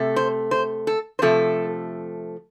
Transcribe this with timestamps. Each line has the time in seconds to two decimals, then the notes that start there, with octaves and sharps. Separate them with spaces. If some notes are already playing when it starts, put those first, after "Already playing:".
Already playing: C3 A3
0.16 C5
0.51 C5
0.87 A4
1.19 C5
1.22 C3 F3 A3 A4